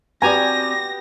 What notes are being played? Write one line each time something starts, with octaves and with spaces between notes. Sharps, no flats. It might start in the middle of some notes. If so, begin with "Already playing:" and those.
B3 C4 F#4 G4 D5 G#5 A#5 A#6